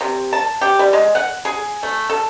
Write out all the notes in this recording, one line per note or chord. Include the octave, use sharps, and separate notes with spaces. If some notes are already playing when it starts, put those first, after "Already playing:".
C3
A5
G4
G3
G#3
F#5
G#4
A3
A4